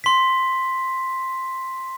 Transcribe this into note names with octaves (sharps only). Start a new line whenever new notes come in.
C6 B6